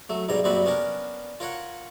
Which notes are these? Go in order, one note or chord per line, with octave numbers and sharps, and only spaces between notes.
F#3 A3
B1 G#2 B2 G3 A#5
F#2 A#2 G3 C4 F#4 B5
B3 C#4 D4 A#4
F4 A#4 C#5 F#5